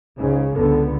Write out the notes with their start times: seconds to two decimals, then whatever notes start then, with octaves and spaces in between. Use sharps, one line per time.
0.19 C#2 G#2 C#3
0.56 C#2 D3 B3 A4